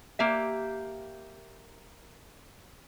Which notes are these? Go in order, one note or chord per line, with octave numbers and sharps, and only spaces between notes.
A#3 G4 E5